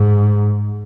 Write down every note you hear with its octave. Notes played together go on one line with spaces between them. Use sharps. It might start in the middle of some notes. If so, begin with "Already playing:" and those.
Already playing: G#2